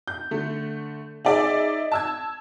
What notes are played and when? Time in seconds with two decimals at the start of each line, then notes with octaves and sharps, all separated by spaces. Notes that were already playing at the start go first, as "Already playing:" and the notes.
0.08 G6
0.31 D3 A3
1.25 D#4 G#4 D5 E5
1.92 A5 E6 G#6